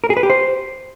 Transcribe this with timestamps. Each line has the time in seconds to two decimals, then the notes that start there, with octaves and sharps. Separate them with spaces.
0.04 A#4
0.10 G#4
0.17 B4
0.23 G4
0.30 C5